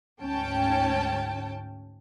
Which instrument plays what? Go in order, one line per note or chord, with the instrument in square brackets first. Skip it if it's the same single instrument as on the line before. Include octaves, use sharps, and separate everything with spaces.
[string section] D2 G#2 C#4 G5 A5